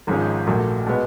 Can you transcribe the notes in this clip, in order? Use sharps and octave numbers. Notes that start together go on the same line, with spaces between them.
G#1 G#2 F3 G#3 C#4
A#1 A#2 F#3 A3
B2 G#3 B3